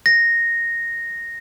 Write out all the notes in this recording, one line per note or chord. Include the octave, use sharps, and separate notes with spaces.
A#6